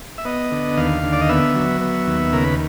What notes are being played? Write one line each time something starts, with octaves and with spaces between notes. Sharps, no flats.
E5
B3 D#5
D3
D#2 F5
D3
D5
D#5
B3 E5
F#3
B3
D#2
C#3 A#4
B4